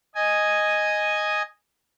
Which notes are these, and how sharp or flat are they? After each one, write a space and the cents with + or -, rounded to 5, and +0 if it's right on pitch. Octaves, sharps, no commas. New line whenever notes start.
D#5 +0 G#5 +0